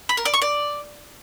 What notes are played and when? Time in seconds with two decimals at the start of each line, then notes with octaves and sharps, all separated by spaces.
0.09 B5
0.17 A#4
0.25 D5
0.34 C#6
0.42 D5